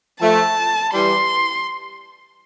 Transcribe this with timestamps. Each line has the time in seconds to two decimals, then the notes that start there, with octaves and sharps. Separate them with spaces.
0.21 F3 A3 A5
0.93 E3 G3 C6